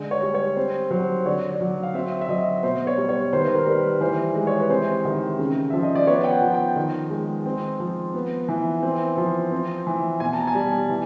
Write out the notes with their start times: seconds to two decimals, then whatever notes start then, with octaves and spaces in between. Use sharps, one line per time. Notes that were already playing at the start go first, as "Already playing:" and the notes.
Already playing: D3 G#3
0.11 C#5
0.22 G3
0.34 C#5
0.56 C4 C5
0.91 F#3 C5
1.25 D3 C#5
1.49 D5
1.61 F#3
1.83 F5
1.94 C4 E5
2.21 E5
2.29 F#3 D#5
2.63 B2 C5
2.87 C#5
2.98 G3
3.09 C#5
3.33 D#3 C5
3.39 B4
3.47 C5
3.55 A#4
3.66 G3 A#4
3.78 B4
4.01 E3 C5
4.35 G#3
4.47 C#5
4.60 B4
4.69 C3 C5
5.05 D#3
5.39 C#3
5.70 F3 E5
5.83 D#5
5.95 D5
6.07 B3 C#5
6.24 G5
6.30 F#5
6.42 F3
6.54 G5
6.76 D#3
7.10 G#3
7.46 C4
7.80 F3
8.14 B3
8.49 E3
8.83 C4
9.17 F3
9.52 C4
9.87 E3
10.20 B2 G#5
10.33 A5
10.39 A#5
10.47 G#5
10.55 G3 A5
10.72 A5
10.89 E3